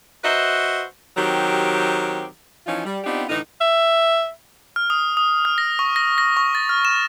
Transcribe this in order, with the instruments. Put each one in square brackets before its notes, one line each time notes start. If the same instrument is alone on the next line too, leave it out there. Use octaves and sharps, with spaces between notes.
[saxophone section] F#4 B4 C5 D#5 E5
D#3 F#3 C4 G4
E3 F3 C#4 D#4 F4
G3
B3 C4 D4 D#4 F4 G4
A2 D3 E3 D#4
[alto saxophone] E5
[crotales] F6
D#6
D#6
F6
A#6
C#6
A#6
A#6
C#6
A6
F6
E7